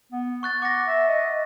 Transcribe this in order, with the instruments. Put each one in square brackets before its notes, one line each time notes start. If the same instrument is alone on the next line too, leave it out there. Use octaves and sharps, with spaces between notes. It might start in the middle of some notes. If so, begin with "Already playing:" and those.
[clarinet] B3
[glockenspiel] C#6 F#6 A6
[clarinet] F#5 [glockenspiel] D6 A#6
[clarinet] E5
D#5